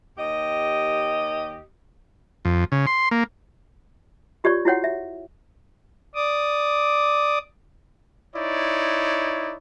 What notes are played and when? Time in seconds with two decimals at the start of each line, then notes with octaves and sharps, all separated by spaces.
0.18 D#2 G4 D#5
2.45 F2
2.72 C#3
2.87 C6
3.11 A#3
4.44 F4 G4 C#5 D5 C#6
4.65 E4 F#4 C#5 F#5
4.84 E5
6.15 D5 D6 D#6
8.36 D#4 E4 C#5 D5